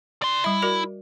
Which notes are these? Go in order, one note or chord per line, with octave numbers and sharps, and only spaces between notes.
D5 C6
G3 E4 E5
F#4 A#4 D5